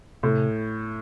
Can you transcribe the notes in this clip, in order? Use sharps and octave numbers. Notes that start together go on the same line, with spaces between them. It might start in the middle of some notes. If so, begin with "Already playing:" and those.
A2 C3